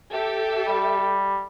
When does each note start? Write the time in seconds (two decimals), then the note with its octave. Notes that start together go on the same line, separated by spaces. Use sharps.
0.13 G4 A4 E5
0.68 G3